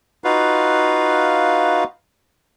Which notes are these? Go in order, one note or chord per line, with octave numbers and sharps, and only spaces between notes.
D#4 F4 F#4 B4 F5